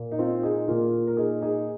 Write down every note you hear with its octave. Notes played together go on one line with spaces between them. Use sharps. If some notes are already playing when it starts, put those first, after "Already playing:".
Already playing: A#2 A#3
D#4
C4 F4
D#4 G#4
A#2 A#3 F4 A#4
A#4
D#4 G#4
D#4 G#4